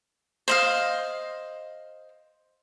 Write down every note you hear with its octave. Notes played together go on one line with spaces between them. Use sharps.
C5 D#5 F5